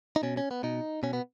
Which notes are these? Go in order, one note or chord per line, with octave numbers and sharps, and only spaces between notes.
D#4
B2 C#4
C#4
B3
B2 D#4
B2 C#4
B3